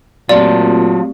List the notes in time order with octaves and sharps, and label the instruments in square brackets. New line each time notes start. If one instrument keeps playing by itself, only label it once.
[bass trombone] A#2 [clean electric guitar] F#3 F4 [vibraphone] A3 C4 G4 [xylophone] D5